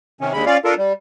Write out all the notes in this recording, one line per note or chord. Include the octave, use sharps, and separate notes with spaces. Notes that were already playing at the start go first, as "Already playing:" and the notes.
C3 D#3 C#4
D#2 D3 G#3 B5
C#4 F4 D5 F5
D4 F4 A4 A#4
G3